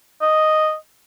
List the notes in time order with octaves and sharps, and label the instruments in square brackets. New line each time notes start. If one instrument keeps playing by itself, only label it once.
[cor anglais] D#5